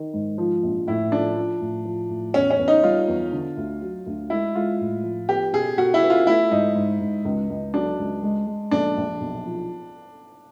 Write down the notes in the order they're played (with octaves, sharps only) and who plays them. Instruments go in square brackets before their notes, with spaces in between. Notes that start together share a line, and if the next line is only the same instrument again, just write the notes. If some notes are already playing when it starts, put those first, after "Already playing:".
Already playing: [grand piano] D#3
G#2
F3
A#1
[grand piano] A2 [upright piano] E4
[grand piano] F3 [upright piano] D4
[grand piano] F3
A2
F3
A2
[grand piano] E2 [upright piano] C#4
[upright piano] C#4
[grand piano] E2
[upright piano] D#4
[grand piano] G3 [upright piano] F4
[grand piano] E2
D3
D2
F#3
D2
[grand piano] G#3 [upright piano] E4
[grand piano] G#3 [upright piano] F4
[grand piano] A2
F3
[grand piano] B3 [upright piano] G4
[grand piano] B2 [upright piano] G#4
[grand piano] B2 [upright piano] F#4
[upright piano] E4
[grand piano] B3
[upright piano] F4
[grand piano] A3 [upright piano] E4
[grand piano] G#2 [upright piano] D#4
[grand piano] G#2
G#2
C#2
C#2
[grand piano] F#3 [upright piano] D4
[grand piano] C#2
G#3
G#3
[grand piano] A#1 [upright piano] D4
[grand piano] A#1
B1
F3